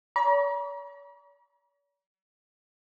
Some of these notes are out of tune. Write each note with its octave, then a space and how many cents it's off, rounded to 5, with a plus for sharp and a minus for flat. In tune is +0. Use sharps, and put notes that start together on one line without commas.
C#5 +45 A#5 +40